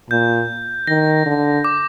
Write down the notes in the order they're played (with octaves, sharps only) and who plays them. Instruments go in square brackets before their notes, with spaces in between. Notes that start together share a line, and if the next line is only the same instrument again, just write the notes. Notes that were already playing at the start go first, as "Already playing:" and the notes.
[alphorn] A#2 [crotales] G6
[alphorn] D#3 [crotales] A#6
[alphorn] D3
[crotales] D6